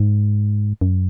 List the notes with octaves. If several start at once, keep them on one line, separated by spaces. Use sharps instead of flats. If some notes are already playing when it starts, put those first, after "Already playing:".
Already playing: G#2
F#2